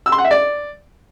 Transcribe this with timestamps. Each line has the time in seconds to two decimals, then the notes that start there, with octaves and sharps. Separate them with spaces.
0.06 E6
0.12 C6
0.18 F#5
0.25 E5
0.31 D5